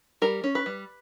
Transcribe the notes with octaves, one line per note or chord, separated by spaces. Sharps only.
G3 A#4
C#4
B4
G3